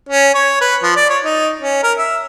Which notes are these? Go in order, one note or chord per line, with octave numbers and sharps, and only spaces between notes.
C#4
C#5
B4
F3
D5
C#5
D#4
C#4
A#4
E5